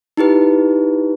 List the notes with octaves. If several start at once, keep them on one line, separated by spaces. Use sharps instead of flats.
D#4 E4 G4 B4